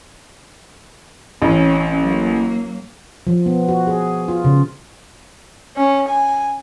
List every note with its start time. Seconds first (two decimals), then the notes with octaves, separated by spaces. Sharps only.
1.42 A1 C4 C#4
2.00 F#3 A#3
3.27 F3
3.46 B3
3.69 F#4
3.87 G#4
4.28 F4
4.45 C#3
5.76 C#4
6.08 G#5